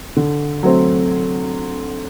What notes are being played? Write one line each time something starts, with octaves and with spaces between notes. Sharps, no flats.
D3
F#3 A3 C4